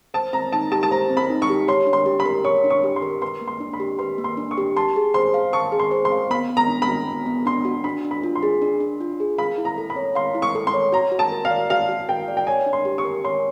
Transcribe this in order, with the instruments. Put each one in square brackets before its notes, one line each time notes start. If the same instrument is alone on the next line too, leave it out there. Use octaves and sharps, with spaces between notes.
[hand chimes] C5 [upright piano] A5
[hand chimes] C4 [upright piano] A#5
[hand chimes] D#4 [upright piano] A5
[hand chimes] G4 [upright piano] A5
[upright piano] A5
[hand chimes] C5 [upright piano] A#5
[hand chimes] C4
[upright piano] B5
[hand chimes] D#4
[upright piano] C#6
[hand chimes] G4
[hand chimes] C#5 [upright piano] C6
[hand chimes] D4
[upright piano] C6
[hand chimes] G4
[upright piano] B5
[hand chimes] A#4
[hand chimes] C#5 [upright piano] C#6
[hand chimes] D4
[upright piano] C#6
[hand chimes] G4
[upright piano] C6
[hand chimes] A#4
[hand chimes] B4 [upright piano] C6
[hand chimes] A#3
[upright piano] C6
[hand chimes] D4
[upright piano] B5
[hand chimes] G4
[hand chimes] B4 [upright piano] C6
[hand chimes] A#3
[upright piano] C6
[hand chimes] D4
[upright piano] C#6
[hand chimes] G4
[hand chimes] A5 [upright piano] C6
[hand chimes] G#4
[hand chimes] C5 [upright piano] C6
[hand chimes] F5
[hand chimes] A5 [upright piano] C#6
[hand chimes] G#4
[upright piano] C6
[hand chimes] C5
[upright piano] C6
[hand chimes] F5
[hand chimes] B3 [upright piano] B5
[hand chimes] B3
[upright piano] A#5
[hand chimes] D4
[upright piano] B5
[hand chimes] F#4
B3
B3
[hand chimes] D4 [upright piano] C6
[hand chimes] F#4
[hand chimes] D4 [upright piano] B5
[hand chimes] D4
[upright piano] B5
[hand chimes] F4
[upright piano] C6
[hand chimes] G#4
D4
D4
F4
G#4
[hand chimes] F5 [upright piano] B5
[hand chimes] E4
[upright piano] A#5
[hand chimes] A4
[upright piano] B5
[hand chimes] C#5
[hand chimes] F5 [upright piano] C6
[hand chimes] E4
[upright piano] C#6
[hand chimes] A4
[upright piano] C6
[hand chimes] C#5
[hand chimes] F#4 [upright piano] A#5
[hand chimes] F#4
[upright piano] A5
[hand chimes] A#4
[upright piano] F5
[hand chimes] D5
[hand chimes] F#4 [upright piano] F5
[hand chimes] F#4
[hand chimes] A#4 [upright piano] G5
[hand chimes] D5
[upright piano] G5
[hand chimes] C#5 [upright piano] G#5
[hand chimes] D4
[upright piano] C6
[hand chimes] G4
[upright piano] C#6
[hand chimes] A#4
[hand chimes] C#5 [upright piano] C6